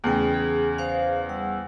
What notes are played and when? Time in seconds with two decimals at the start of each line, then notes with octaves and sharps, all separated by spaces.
0.04 E2 C#3 A3 G5
0.34 G#4
0.78 C5 F5
1.29 G3 F#5 E6